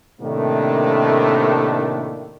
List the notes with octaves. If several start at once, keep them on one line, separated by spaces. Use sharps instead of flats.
A2 C3 D#3 A3 A#3 D4